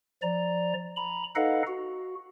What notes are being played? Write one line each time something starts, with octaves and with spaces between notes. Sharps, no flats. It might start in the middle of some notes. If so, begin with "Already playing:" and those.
F3 D5 A#5
A#5 B5
D#4 A4 B4 D#5 F5 F#5
F#4